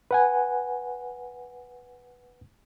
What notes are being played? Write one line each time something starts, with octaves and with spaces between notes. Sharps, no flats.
B4 F#5 G#5